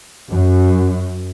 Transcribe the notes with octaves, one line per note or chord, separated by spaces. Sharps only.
F#2